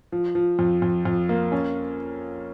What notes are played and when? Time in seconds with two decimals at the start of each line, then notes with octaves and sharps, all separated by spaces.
0.12 F3
0.35 F3
0.59 F2
0.82 F2
1.05 F2
1.29 A#3
1.52 C#4